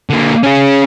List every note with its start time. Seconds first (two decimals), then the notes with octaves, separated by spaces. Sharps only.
0.10 D3 A#3
0.44 C#4 G#4